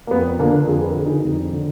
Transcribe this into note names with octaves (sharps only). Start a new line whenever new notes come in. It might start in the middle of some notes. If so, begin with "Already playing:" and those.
A#3
F2 B3
D3 A#3 D4
F2 F4 G#4
B4
A#4
D3 G#4
D#4 F#4
F2
D3